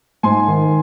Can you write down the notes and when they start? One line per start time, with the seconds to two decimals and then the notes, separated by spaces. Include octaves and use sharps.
0.23 G#2 G#5 C6
0.48 D#3